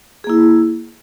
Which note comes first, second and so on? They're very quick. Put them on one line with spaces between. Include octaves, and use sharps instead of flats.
G#4 A#3 E4